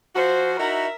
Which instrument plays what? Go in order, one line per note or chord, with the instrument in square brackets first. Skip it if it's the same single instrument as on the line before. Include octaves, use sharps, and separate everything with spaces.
[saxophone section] F3 F4 F#4 [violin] C5
[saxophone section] D#4 E4 F#4 [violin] A#4 E5